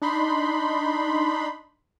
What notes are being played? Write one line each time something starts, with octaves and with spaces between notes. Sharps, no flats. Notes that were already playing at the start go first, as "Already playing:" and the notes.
D4 D#4 B5 C6